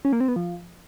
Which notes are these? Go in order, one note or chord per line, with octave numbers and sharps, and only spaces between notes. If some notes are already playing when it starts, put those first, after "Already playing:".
C#4
A#3
C4
B3
F3